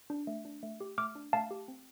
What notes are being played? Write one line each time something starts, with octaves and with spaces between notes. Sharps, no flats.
D4
A3
D4
A3
G4
A3 D6 F6
D4
A3 F5 A5
G4
C4